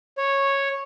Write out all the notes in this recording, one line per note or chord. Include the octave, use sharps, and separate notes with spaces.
C#5